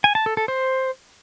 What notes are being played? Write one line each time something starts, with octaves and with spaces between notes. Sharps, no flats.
G#5
A5
A4
A4
C5